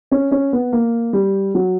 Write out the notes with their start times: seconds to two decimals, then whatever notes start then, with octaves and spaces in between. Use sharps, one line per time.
0.11 C#4
0.31 C#4
0.53 B3
0.73 A#3
1.13 G3
1.55 F#3